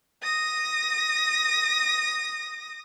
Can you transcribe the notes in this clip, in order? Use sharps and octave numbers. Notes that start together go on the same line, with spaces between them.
D#6 A#6